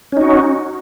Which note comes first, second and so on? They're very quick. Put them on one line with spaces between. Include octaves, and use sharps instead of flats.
C#4 D#4 F#4